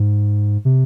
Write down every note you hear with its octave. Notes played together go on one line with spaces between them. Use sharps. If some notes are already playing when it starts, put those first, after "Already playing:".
Already playing: G#2
C3